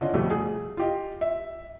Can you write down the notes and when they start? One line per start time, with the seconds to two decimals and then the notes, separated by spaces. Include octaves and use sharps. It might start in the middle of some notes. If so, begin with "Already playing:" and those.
0.01 D3 C#4 F4 D#5
0.14 F2 B2 G3 A3
0.30 G#4
0.77 F4 G4 D#5
1.21 E5